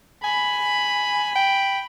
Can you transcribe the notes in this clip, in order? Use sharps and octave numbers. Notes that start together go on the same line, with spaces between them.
G#5 B5
G5